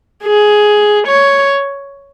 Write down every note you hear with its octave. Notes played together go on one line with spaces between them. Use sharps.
G#4
C#5